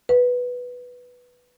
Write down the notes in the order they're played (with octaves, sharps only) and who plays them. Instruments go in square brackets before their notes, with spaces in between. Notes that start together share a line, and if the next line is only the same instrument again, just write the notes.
[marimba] B4